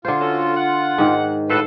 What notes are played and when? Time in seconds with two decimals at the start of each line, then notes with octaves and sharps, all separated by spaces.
0.05 D3 F4 C5
0.21 C#4 F#4 A4
0.57 F#5
0.98 G#2 D#3
1.49 A2 F4 F#4 A4 B4 C5